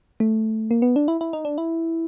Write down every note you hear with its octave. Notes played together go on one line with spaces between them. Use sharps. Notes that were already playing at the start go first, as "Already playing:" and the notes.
A3
A#3
B3
D4
E4
E4
D#4
D4
E4